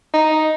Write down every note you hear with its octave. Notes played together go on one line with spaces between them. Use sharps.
D#4